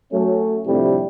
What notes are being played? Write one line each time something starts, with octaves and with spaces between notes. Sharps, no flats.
F#3 A3 C#4
F2 A2 C3 G3 A3 D4